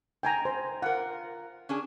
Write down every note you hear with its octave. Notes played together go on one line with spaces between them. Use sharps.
D#4 G5 G#5 A#5
C5
F4 A#4 F#5
C#4 D4 G#4